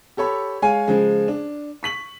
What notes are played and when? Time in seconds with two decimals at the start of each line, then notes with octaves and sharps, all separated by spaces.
0.17 G4 A4 C#5 B5
0.62 G#3 C#5 F5 G#5
0.88 C#3 F3 G#3
1.28 D4
1.83 C#6 B6 F#7